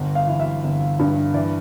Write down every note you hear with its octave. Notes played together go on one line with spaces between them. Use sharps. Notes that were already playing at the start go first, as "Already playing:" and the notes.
Already playing: G1
F5
E3
E5
G1
G2
E3 D5